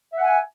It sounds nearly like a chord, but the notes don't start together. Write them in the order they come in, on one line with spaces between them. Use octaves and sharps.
E5 F#5 G#5